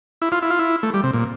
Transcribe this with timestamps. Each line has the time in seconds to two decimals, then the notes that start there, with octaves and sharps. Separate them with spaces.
0.22 E4
0.32 F4
0.42 E4
0.50 F4
0.59 E4
0.83 A3
0.94 G3
1.04 C3
1.14 A#2